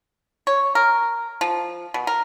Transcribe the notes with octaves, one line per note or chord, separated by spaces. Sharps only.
C#5
A#4
F3
B2
A#4